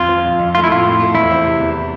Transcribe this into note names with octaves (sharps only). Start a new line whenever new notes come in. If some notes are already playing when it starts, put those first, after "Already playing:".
Already playing: F2 F4
F3
F2
F2
A3 F4
E4
A2 F4
A2
A3
E2 E4
C4
C3
E2